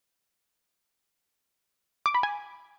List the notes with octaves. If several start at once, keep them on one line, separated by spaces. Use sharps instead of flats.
D6
B5
G#5